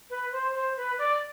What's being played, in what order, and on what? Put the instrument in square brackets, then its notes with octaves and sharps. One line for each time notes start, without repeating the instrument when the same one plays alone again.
[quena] B4
C5
C5
B4
D5